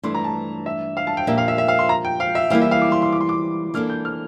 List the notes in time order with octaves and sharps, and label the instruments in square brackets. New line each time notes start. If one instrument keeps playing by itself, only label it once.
[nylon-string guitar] G2 E3 A3 D4 [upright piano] C6
[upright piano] A#5
A5
E5
F5
A5
G5
[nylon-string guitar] A#2 F3 A#3 D4 G4 [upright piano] E5
[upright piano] F5
E5
E5
F5
C6
A#5
G5
F5
E5
[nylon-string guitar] E3 G3 A#3 E4 [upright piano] F5
[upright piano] E5
F5
D6
C6
C6
D6
C6
D6
[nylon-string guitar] E3 A#3 D4 A4 [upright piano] F6
[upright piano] G6
F6